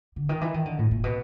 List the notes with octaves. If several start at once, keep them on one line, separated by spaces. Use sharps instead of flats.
D3
D#3
E3
D#3
D3
A2
A#2
B2